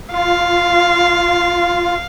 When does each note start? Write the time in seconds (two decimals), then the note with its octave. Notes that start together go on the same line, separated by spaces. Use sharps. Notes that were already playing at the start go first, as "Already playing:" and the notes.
0.13 F4 F5